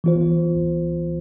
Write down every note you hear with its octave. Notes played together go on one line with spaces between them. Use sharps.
E3 B3 F4 C5